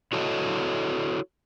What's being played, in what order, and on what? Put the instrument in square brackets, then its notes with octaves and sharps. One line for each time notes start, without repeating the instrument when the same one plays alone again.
[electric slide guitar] E4 F#4 A4 C#5 D#5